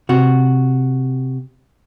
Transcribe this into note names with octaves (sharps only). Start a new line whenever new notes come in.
C3 F#4